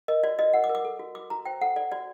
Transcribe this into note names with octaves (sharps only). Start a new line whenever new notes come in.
A#4 D#5
F#4 D5
F#4 D#5
A#4 F#5
D6
A#4
D6
A4
F#4
F#4 D6
F#4 A#5
C5 G5
A4 F#5
A4 D5
F#4 D5